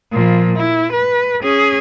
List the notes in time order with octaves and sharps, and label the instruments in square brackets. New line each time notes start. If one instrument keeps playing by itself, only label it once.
[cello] A#2 F3
E4
B4
C#4 G#4